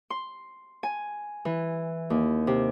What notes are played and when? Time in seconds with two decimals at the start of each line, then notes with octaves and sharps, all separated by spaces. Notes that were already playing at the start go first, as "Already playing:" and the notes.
0.10 C6
0.83 G#5
1.45 E3
2.10 D#2
2.47 C3